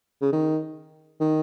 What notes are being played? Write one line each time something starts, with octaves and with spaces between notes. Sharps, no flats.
C#3
D#3
D#3